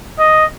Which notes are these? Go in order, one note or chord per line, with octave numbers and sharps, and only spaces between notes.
D#5